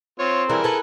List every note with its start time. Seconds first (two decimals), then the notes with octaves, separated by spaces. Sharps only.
0.19 C4 F4 C#5
0.49 E3 G3 E4 G#4 A#4
0.64 A4 B4